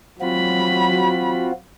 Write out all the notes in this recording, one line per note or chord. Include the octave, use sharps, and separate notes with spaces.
F#3 C4 F4 F#4 B5